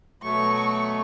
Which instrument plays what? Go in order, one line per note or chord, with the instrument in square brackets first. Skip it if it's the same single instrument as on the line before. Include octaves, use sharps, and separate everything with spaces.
[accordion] B2 F#3 A3 [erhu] C#6